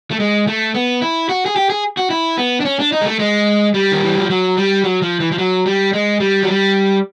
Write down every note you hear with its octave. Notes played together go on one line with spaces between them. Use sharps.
A3
G#3
A3
B3
E4
F#4
G#4
G4
G#4
F#4
E4
B3
D4
C#4
D4
D#4
G#3
A3
G#3
G3
D#3
E3
F3
F#3
G3
F#3
F3
E3
F3
F#3
G3
G#3
G3
F#3
G3